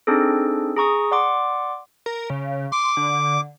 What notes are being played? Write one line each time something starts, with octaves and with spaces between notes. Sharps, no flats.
C4 D4 D#4 G#4 A4
G#4 A#5 C#6 D#6
D5 F#5 C6 D6
A#4
C#3
C6 D6
D3